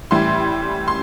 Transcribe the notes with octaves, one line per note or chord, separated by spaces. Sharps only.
A2 E3 G3 C6
C6